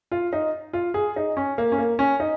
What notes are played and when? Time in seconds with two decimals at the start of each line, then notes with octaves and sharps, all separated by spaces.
0.12 F4
0.33 D#4
0.73 F4
0.94 G#4
1.16 D#4
1.37 C#4
1.58 A#3
1.72 C#4
1.78 A#3
1.99 C#4
2.20 D#4